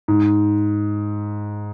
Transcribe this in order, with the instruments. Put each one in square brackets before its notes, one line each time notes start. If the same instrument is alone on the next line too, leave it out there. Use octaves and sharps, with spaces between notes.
[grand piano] G#2